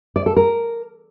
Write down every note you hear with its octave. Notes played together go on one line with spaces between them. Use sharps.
D5
A4
A#4